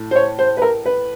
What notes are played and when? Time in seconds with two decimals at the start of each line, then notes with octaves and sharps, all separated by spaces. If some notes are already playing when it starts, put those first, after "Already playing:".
Already playing: A2
0.11 C5
0.16 C#5
0.39 C5
0.57 B4
0.62 A#4
0.86 B4